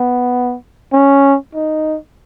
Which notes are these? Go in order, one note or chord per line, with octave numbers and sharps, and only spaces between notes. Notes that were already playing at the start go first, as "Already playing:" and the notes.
Already playing: B3
C#4
D#4